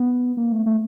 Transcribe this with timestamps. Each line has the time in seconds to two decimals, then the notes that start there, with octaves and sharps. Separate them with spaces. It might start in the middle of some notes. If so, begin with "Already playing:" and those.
Already playing: B3
0.37 A#3
0.52 A3
0.66 A3